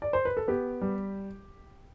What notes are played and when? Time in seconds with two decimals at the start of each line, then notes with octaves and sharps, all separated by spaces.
0.02 D5
0.13 C5
0.25 B4
0.37 A4
0.48 B3 G4
0.81 G3